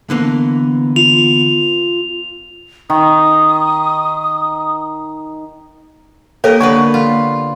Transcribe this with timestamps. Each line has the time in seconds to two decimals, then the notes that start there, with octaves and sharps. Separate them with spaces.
0.10 D3 E3 A#3 B3
0.96 F4 F7
2.90 D#3 D#6
6.44 A#3 G4 A4 A#4 C#5 D#5
6.60 D3 B3 B4 C#6
6.94 F4